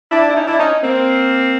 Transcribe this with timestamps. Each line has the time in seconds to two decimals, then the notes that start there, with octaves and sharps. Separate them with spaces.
0.11 D4 E4
0.29 E4
0.36 C#4 D#4
0.47 D4 E4
0.59 C#4 D#4
0.83 A#3 C4